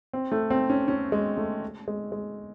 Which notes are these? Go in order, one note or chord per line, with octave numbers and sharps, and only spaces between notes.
C4
A3
C4
C#4
C#4
G#3
A3
G#3
G#3